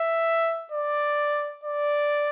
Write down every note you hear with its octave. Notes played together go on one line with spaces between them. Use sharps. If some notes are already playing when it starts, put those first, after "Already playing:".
Already playing: E5
D5
D5